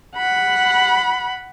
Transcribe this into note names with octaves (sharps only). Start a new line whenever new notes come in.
F#5 B5